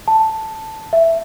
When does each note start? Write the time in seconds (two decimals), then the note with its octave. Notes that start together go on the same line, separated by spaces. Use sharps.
0.08 A5
0.93 E5